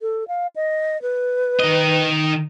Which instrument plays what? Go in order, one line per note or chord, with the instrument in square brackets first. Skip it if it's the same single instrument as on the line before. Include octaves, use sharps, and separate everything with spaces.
[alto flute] A4
F5
D#5
B4
[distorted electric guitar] D#3 D#5